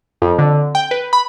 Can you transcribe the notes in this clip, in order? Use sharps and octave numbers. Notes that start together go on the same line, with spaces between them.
F2
D3
G5
B4
B5